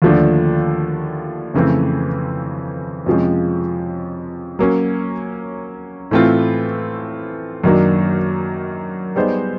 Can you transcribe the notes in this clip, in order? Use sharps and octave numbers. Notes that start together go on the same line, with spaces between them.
D#2 D3 F3 A3 D4
F2 C#3 E3 A3 C4
F2 C3 F3 G#3 C#4
F#3 A#3 C#4
A2 E3 A3 C4 F4
F#2 D#3 F#3 A#3 D4
G3 B3 D#4 G#4 C5